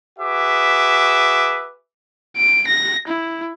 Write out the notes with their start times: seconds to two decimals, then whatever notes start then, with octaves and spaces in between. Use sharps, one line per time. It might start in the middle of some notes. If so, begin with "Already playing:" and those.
0.19 F#4 G#4 B4 E5 D6
2.37 D7
2.67 A#6
3.07 E4